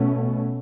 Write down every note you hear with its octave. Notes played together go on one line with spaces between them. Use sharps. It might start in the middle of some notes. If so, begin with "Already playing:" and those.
Already playing: B2 A3 C#4